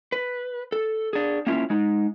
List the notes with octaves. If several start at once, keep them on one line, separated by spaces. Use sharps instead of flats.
B4
A4
D4 G#4
A#3 C#4 E4 F4
G#3 D#4